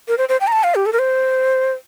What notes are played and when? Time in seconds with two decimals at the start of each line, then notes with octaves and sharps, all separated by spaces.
0.08 A#4
0.18 C5
0.29 C5
0.41 G5
0.47 A#5
0.52 A5
0.64 F5
0.75 G4
0.86 A4
0.93 A#4
0.99 C5